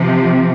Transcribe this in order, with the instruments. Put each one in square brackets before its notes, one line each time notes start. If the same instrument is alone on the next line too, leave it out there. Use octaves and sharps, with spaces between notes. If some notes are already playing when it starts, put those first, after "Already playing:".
Already playing: [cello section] C3 F3